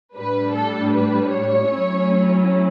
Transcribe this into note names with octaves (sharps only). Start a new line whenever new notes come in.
A2 G3 D4 B4
A4
B4
C#5
F#3 A3 C#4 E4